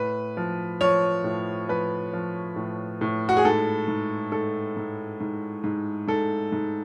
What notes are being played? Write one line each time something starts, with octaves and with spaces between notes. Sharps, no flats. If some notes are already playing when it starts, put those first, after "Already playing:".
Already playing: A2 B4
F3
F3 C#5
A2
F3 B4
F3
A2
A2
F#4
G#4
G#2 A4
G#2
G#2 A4
G#2
G#2
G#2
G#2 A4
G#2